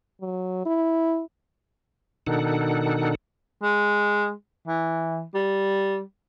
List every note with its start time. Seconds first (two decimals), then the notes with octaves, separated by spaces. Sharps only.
0.21 F#3
0.66 E4
2.27 B2 D#3 D4 D#4 A4 F#5
3.62 G#3
4.67 E3
5.34 G3